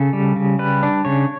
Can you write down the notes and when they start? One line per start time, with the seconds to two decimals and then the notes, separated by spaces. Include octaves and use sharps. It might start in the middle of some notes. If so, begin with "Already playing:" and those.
Already playing: C#3 A4
0.13 G3
0.36 C#3
0.59 G3 B4
0.83 D4
1.05 C#3 C#5